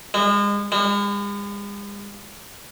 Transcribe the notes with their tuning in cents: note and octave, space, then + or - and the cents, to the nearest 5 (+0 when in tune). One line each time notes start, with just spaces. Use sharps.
G#3 -35
G#3 -45